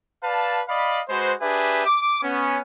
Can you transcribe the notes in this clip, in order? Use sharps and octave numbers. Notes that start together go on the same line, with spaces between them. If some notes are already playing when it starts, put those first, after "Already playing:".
B4 D5 F5 A5
D5 D#5 F5 B5
G#3 F#4 B4 C5
D4 G4 G#4 B4 E5
D6
B3 C#4